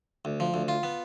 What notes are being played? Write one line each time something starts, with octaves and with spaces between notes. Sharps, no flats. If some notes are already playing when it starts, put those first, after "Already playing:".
D2
F3
D2
F4
B3